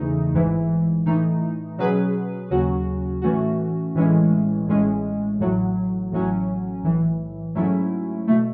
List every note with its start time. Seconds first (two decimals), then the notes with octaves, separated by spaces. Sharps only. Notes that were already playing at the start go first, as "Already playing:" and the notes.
Already playing: E2 C#3 E3 A3 D#4
0.33 A1 G#2 E3
1.05 A2 E3 A3 D#4
1.78 B2 F#3 C#4 G#4 B4
2.50 D#2 C#3 F#3 C#4 F#4
3.22 A2 E3 A3 C#4 F#4
3.94 A1 A2 E3 G#3 C#4
4.67 A1 A2 G#3 C#4
5.39 A1 A2 F#3
6.12 A1 A2 F#3 C#4
6.83 B1 A2 E3
7.55 G#2 F#3 A3 C#4 E4
8.27 B2 A3